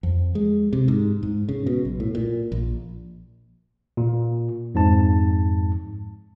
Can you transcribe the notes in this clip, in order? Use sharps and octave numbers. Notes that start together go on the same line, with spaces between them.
F2
G#3
C3
G#2
G#2
C#3
B2
B1
A2
A#2
A#1
A#2
F2 G#2 A5